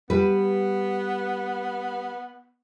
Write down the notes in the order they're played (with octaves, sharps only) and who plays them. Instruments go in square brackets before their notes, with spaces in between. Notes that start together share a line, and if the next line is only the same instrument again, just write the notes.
[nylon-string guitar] G3 B4 [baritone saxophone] B3